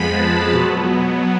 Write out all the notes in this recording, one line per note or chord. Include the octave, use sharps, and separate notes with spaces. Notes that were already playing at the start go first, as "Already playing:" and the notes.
Already playing: F2 F3 G#3 B3 B5
A5
B2 F#3 B3